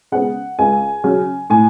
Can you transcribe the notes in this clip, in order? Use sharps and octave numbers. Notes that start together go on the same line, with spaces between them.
C#3 G#3 B3 F#5
C#2 G#5
C#3 F#3
A2 G#5